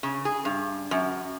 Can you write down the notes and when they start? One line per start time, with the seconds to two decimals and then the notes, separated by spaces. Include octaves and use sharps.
0.03 C#3
0.25 G#4
0.45 G2
0.91 F#2